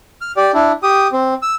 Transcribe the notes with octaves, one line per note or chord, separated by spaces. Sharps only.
F6
G4 D5
D4 E4
G4 D#6
C4
E6